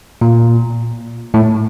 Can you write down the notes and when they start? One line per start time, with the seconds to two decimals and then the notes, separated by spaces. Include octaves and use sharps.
0.21 A#2
1.34 A2